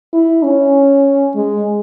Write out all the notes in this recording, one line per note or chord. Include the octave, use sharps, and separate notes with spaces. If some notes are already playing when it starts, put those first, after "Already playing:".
E4
C#4
G#3